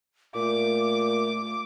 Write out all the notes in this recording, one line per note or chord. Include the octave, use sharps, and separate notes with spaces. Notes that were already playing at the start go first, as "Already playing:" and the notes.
A#2 A3 D6